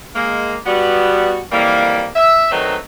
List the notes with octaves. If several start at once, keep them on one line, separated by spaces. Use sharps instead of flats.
G#3 A#3
G3 B3 F#4
F2 E3 G3 A#3
E5
D#3 F#3 A3 C4 D#4 B4